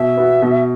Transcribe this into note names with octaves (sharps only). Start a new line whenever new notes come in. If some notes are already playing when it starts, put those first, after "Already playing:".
Already playing: B2 E5
B3 F#4
B2